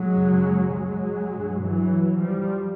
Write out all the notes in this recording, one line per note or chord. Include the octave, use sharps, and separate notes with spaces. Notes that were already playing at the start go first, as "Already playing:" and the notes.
Already playing: F#3 G#3
F#2 C#3
F#3 G#3
G2
E3 F#3
F3 G3